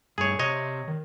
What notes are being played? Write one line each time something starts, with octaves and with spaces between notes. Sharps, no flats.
G2 A3 G#4 C#5
C3 G4 C#5 D#5
D#3